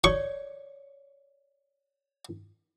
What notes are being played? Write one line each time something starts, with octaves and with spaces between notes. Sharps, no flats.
C#5 D5 C#6